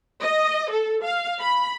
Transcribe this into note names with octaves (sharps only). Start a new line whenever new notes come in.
D#5
A4
F5
B5